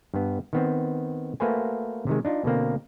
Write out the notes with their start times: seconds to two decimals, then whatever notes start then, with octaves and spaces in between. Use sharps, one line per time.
0.14 G2 B3
0.53 D#3 B3 C4
1.40 A3 A#3 F#4 B4 C5 G#5
2.07 C3 D#3 G#3
2.25 D4 D#4 F4
2.44 B2 D3 A#3 C4